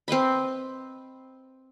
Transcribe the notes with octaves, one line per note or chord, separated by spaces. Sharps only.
C4 B4 D#5 B5